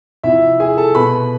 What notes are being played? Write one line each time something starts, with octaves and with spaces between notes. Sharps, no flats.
C3 F3 E4 E5
G#4 G#5
A4 A5
B2 B4 B5